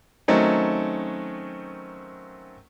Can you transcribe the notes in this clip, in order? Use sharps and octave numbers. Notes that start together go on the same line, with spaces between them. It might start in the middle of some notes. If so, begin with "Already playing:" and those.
D#3 F#3 A3 C4 C#4 D#4